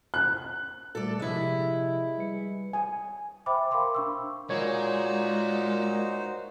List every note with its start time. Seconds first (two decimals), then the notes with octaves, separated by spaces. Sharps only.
0.14 F#6
0.95 A#2 G3 A3 A4 D5
1.19 C3 F3 G#3 E4 G4
2.18 G3 B4 C#7
2.73 G#5
3.46 C5 E5 G5 B5 D6
3.71 A#4 F5 G5 B5 C6 D6
3.95 D4 C#6 E6
4.50 A#2 G#3 D#4 F#4 C5 C#5